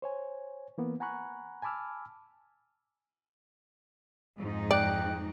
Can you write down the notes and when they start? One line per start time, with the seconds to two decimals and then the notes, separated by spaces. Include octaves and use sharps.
0.02 C5 C#5 G#5
0.78 E3 A#3 B3
1.00 F#5 G#5 A#5 B5 C#6 F#6
1.62 G#5 A5 B5 D6 E6 F6
4.37 F2 G#2 D#4
4.71 D5 G5 F#6